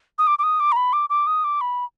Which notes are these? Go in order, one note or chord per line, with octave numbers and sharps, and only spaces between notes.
D#6
D6
D6
D#6
D6
A#5
B5
D6
D6
D#6
D6
B5